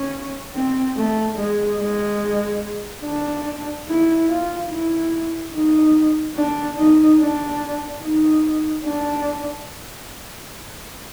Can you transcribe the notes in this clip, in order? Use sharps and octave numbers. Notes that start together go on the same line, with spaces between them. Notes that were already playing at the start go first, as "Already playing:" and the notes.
Already playing: C#4
C4
A3
G#3
G#3
D4
E4
F4
E4
D#4
D4
D#4
D4
D#4
D4